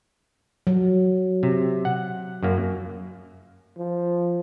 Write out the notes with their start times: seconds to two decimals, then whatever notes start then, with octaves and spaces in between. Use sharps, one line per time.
0.67 F#3
1.43 C3
1.85 F#5
2.43 F#2 A#3
3.78 F3